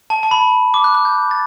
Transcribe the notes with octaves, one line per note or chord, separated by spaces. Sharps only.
A5
A5
B5
D6
F#6
F#6
G6
G6
A6